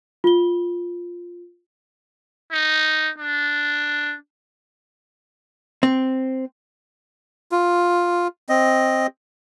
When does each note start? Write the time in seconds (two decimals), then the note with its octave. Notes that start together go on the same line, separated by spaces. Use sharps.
0.24 F4 G7
2.52 D#4
3.18 D4
5.83 C4
7.52 F4
8.49 C4 D#5